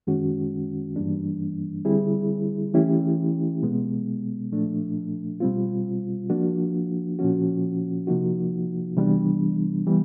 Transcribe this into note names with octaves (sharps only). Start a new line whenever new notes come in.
F#2 D#3 G#3 C#4 F#4
G2 E3 G3 A#3 D4
D3 G3 C4 E4 G#4
E3 A3 C#4 E4 G4
B2 G#3 B3
A#2 F3 A3 D4
B2 G3 C4 F4
F3 A#3 D4 F#4
A#2 F3 A#3 C#4 F#4
C3 F3 A#3 D#4 F#4
C3 E3 G3 B3 D4
E3 G3 B3